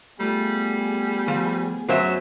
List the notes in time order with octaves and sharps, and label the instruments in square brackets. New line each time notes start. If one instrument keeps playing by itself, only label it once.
[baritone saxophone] G3 [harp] A3 F4 [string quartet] B3 G#4
[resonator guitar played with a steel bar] F3
[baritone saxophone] F#2 [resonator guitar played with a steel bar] F#3 C5 E5